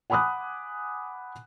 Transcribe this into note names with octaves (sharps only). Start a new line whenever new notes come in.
F#5 G#5 B5 D6 D#6 F#6